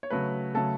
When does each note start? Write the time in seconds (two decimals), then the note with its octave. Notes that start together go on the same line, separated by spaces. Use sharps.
0.03 C#5
0.10 C#3 F#3 A3 B4
0.55 C#3 F#3 A3 A4